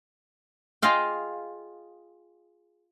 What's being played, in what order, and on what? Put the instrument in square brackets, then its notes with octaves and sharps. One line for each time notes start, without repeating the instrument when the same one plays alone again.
[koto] F4 G#4 D#5 F5 G5